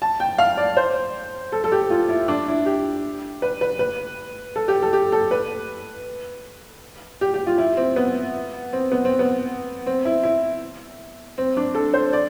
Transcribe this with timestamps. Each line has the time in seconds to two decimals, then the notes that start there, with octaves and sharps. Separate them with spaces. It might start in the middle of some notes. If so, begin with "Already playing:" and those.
0.02 A5
0.20 G5
0.38 F5
0.57 D5
0.77 C5
1.52 A4
1.64 A4
1.72 G4
1.90 F4
2.09 E4
2.28 D4
2.48 E4
2.66 G4
3.42 B4
3.61 B4
3.79 B4
4.56 A4
4.68 G4
4.82 A4
4.93 G4
5.12 A4
5.31 B4
7.21 G4
7.34 G4
7.47 F4
7.58 E4
7.77 C4
7.96 B3
8.73 C4
8.92 B3
9.05 C4
9.19 B3
9.86 C4
10.05 E4
10.23 E4
11.38 C4
11.57 D4
11.75 A4
11.93 C5
12.13 D5